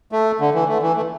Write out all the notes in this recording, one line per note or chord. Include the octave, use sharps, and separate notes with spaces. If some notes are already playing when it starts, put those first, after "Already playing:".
A3
D3
E3
A3
E3
A3